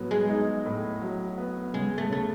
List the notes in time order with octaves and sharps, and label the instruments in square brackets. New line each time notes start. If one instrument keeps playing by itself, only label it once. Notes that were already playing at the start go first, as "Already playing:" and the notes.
Already playing: [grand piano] A2 F#3 B3
[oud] G#3
[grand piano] D#4
A2
F#3
B3
[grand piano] C#3 [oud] G#3
[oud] A3
[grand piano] C#3 [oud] A3